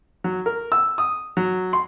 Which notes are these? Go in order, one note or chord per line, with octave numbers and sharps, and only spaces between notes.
F#3
A#4
E6
D#6
F#3
C6